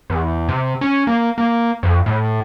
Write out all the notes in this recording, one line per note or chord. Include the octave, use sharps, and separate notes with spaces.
E2
C3
C#4
A#3
A#3
F2
A2